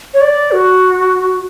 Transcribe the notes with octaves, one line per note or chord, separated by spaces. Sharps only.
C#5
D5
F#4